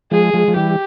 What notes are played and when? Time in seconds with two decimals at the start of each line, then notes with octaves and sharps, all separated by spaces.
0.12 F3 G#3 G#4
0.34 F3 G#3
0.48 F3
0.55 E3 G3 G4